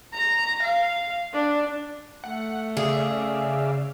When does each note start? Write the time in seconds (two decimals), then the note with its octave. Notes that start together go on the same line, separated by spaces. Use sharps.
0.13 A#5
0.63 F5
1.33 D4
2.24 A3 F#5
2.77 C#3 G#4 D5 E5 F5